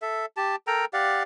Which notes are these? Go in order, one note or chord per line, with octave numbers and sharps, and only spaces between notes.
A4 E5
G4 A5
A4 A#4 G5 A#5
G4 D5 F5 F#5